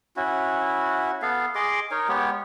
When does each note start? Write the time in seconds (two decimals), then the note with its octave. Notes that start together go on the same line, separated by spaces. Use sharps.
0.17 C#4 E4 F#4
1.22 B3 A4 F5
1.55 G#4 D#5 C6 D6
1.91 D#4 A#4 C#5
2.09 G#3 B3 G4 C#5